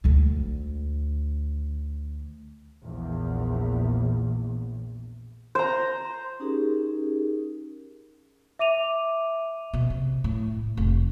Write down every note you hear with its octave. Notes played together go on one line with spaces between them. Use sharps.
D2 D3
A#1 E2
C5 A#5
C#4 D#4 G4 G#4 A#4
E5 D6 D#7 F7
B2
C3
A2
F1